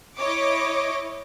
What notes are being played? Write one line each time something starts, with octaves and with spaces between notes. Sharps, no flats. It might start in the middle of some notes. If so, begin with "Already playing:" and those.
E4 C#5 D#5 C#6 D6